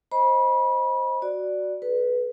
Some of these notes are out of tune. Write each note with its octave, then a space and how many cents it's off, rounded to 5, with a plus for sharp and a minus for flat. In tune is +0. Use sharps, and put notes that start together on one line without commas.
C5 +10 D#5 +0 B5 -30
F#4 +0 D5 +0
G#4 +45 B4 -5